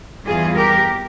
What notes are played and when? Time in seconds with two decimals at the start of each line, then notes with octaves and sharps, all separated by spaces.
0.25 E2 E3 G3 F4 G#4
0.55 G4 A#4